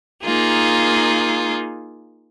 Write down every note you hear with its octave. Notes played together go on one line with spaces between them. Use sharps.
A#3 D#4 F4 G#4